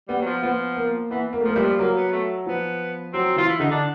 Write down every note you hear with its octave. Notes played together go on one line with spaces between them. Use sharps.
G3 B3
F#3
F3
F3 B3
A#3
E3 B3
A#3
A3
F3 A#3
E3 G3
F3
F#3 A#3
B3
A3
F3 B3
F#3 C4
E3 F4
E4
D3 D#4
D4